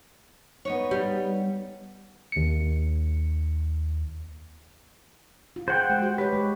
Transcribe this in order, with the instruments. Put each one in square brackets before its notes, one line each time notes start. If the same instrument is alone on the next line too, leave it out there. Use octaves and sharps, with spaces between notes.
[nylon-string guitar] B3 D#4 C#5
[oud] G3
[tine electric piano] D#2 C#7
[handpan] F4
[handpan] G#4 [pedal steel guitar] C5 F#5 G5
[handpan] G#3
F#4 G4
[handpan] G4 C#5 [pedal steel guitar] B4
[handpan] G#3